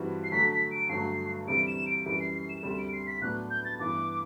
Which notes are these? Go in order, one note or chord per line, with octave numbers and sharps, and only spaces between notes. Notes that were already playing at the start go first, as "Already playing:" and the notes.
Already playing: G2 E3 G3 C4 F#4
C7
D3 F#3 A3 B6
B6
D7
G2 D3 F#3 A3 C7
D2 C3 E3 G3 D7
E7
D7
F#2 E3 G3 D7
C7
C7
E7
D2 C3 G3 E7
D7
C7
B6
A2 F#3 B3 D4 F#6
G6
A6
G2 E3 B3 D6